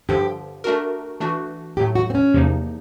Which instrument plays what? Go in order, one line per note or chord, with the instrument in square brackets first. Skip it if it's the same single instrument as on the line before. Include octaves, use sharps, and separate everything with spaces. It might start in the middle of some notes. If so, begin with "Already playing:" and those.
[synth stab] G2 D3 F3 [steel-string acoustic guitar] G4
[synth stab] A3 D4 F#4 A#4
E3 A3 D4 F#4
[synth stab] A2 F#3 A3 [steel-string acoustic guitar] G4
[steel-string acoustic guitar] F#4
C4
C#4
[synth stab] E2 C3 F3 A#3 D#4